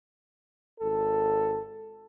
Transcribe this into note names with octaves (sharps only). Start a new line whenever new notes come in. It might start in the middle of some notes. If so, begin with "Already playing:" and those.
G#1 A4